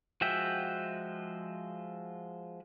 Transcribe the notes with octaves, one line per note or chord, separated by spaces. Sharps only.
F3 G#3 F#4 E5 G5